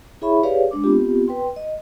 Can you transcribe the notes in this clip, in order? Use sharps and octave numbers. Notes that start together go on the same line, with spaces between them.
E4 G#4 C#5 E5 B5 C#6
G4 G#4 B4 C#5 D5 F5
G#3 D4 D6
B3 C4 F4 G4
B4 G5 C6
D#5